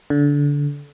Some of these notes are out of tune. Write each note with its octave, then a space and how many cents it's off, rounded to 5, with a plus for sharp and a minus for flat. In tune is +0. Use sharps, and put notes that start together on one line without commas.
D3 -20